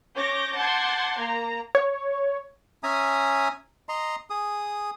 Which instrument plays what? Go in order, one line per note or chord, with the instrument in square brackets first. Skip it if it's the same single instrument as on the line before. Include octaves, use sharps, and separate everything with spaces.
[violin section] C#4 C#5 D6 G6 A#6
F#5 A5 C6 D6 G6 G#6
A#3 A#5
[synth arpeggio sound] C#5
[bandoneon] C#4 E5 G#5 A#5 D#6
D#5 A#5 C6
G#4 D#6